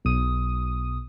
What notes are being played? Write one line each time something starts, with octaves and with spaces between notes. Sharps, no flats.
B1 D#6